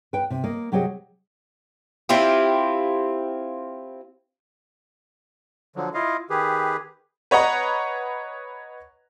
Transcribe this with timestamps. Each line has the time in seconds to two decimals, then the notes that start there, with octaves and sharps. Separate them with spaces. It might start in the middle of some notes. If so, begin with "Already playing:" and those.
0.13 B4 G5
0.30 C3
0.44 A#3 D#5
0.72 C3 F#3 G4 G#4 D#5
2.09 C4 E4 F4 G4
5.76 D3 F3 F#3
5.94 E4 F4 D#5 F5
6.30 D#3 G4 G#4 B4
7.31 B4 C#5 D#5 F#5 A#5